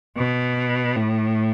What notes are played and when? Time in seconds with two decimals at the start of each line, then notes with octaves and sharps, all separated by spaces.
0.17 B2
0.96 A2